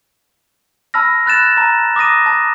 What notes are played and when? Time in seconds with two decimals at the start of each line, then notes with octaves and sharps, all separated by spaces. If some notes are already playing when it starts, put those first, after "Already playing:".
0.94 A5 B5 E6 F6 A#6
1.26 B5 F#6 A6 E7
1.57 A5 A#5
1.96 D6 D#6 A#6 D#7
2.26 A5